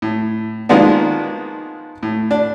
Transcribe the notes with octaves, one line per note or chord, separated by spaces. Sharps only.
A2
D#3 F3 G#3 A#3 B3 D4
A2
D4